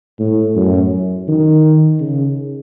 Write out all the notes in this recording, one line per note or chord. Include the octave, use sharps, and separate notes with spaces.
A2
F#2
D#3
C#3